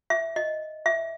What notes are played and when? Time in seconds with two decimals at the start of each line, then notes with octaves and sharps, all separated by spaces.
0.10 E5
0.36 D#5
0.86 E5